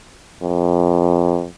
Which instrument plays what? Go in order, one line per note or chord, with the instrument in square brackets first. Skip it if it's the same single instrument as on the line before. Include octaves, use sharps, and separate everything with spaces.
[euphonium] F2